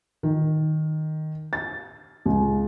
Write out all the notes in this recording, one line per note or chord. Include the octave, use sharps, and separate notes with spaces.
D#3
A6
C#2